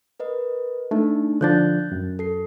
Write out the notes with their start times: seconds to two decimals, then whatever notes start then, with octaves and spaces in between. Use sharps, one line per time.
0.20 A#4 B4 D#5
0.91 A3 D4 D#4
1.41 D3 F3 D4 F#6 G6 A6
1.92 F#2
2.19 A4 C7